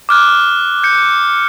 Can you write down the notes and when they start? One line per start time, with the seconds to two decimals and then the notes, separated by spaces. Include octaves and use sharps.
0.09 D6 F6 F#6
0.83 G6 C#7